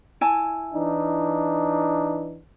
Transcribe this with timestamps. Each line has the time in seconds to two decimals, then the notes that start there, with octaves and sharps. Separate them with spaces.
0.21 E4 G#5 A5
0.74 E3 D4 D#4